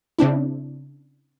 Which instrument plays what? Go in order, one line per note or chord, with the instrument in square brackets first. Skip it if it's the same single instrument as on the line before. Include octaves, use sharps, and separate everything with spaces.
[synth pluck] C#3 C4 D4 E4